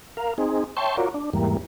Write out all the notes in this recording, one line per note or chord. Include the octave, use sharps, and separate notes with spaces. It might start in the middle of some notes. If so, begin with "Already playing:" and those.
A#4 F5
C4 D#4 G#4
C#5 E5 G5 A5 C6 C#6
F4 F#4 A#4 C#5 D5
D4
E2 G#2 E3 G3 A#3